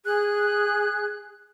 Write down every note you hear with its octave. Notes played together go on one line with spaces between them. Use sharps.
G#4 F#6